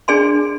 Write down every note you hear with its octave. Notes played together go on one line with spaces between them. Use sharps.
D4 G#4 D5 G#5 C6